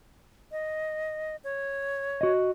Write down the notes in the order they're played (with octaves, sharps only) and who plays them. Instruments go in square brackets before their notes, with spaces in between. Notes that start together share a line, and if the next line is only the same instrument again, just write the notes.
[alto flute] D#5
C#5
[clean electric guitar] F#4 D#5